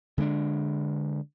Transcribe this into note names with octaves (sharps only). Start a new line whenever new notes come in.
D3 G#3 A#3 D4